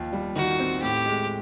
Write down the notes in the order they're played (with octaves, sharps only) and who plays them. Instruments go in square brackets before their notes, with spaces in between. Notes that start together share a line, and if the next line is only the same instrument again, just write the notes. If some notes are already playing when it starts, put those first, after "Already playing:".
Already playing: [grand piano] D#2 F3
G3
[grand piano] D#3 [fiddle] F#4
[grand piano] C4
[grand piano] A2 [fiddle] G4
[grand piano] G#3